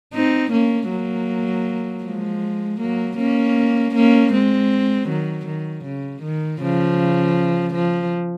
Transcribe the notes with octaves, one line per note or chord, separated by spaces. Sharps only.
C4 D#4
A#3 C#4
F#3 A#3
F3 G#3
F#3 A#3
A#3 C#4
A#3 C#4
G#3 C4
D#3 F#3
D#3
C#3
D#3
C#3 F3
F3